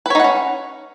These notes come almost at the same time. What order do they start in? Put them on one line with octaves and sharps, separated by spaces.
B4 C#5 D#4 F#5 C#4